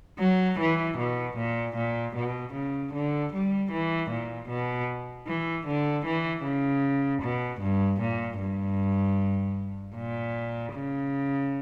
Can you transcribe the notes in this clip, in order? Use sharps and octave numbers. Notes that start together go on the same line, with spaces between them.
F#3
E3
B2
A#2
A#2
B2
C#3
D3
G3
E3
A#2
B2
E3
D3
E3
C#3
B2
G2
A#2
G2
A#2
C#3